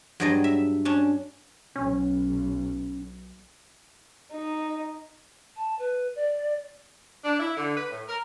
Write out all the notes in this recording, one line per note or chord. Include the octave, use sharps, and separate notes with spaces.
G2 F#3 G#4 D5 D#5
E5
C#4 D4
B1 C#4
D#4
A5
B4
D5
D4
E4
D3
B4
A2
A#4